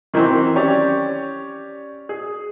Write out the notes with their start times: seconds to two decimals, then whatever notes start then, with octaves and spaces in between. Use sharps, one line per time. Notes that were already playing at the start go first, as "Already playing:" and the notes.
0.14 D#3 E3 F#3 C4
0.56 C#4 G4 C#5 D5
2.09 G#4